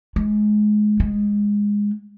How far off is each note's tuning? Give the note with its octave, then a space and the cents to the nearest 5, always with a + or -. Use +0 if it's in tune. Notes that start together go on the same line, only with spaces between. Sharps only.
G#3 +20
G#3 -15